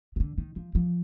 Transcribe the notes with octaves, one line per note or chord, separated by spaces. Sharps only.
C3
D3
D#3
F3
F3